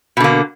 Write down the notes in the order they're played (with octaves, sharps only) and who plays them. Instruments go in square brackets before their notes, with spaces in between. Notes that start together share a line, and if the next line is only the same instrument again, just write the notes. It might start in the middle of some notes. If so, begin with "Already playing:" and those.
[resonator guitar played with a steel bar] B2
D3
A#3